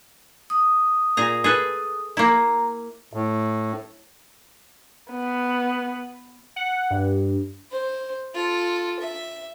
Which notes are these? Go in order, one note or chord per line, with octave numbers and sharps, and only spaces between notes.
D#6
A#2 G#4 A#5
G#4 A4 B4
A#3 E4 A#5
A2
B3
F#5
G2
C5
F4 A4
E5